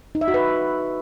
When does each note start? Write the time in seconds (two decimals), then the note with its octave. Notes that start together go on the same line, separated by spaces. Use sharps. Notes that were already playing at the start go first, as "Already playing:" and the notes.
0.15 D#4
0.21 E5
0.28 F#4
0.34 B4